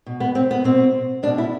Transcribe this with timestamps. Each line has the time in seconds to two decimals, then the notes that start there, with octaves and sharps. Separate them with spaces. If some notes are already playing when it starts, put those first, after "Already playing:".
0.06 B2
0.20 B3
0.35 C4
0.51 B3
0.64 B2 C4
1.23 B2 D4
1.38 E4